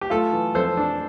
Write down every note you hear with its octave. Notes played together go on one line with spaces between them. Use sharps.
G4
A3 F4 A4
E3
F2 A4 C5
D4